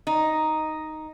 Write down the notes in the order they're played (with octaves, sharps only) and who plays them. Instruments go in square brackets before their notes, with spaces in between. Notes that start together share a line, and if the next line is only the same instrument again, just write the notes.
[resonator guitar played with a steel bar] D#4